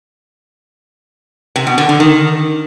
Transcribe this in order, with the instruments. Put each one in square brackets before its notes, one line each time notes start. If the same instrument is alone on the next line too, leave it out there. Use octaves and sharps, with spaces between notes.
[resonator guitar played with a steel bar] C3
B2
D3
D3
D#3